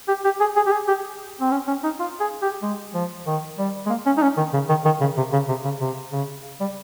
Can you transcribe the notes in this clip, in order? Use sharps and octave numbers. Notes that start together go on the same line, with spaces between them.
G4
G4
G#4
G#4
G4
G#4
G4
C4
C#4
C#4
D#4
F4
G#4
G4
G#3
F3
D#3
G3
G#3
A#3
C#4
D#4
C#4
D#3
C#3
D#3
D#3
C#3
C3
C#3
C3
C#3
C3
C#3
G3